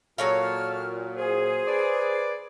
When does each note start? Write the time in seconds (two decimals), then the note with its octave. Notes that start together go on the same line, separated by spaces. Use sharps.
0.18 A#2 F#3 A4 C#5 F5 A5 F6
1.18 G#4 C5
1.67 B4 D5